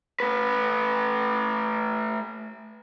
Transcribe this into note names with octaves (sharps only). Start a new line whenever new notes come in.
A3 B4